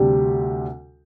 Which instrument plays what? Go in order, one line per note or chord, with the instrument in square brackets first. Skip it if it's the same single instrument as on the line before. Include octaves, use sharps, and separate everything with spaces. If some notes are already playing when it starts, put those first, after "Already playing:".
Already playing: [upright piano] D2 C3 G3 D4 G4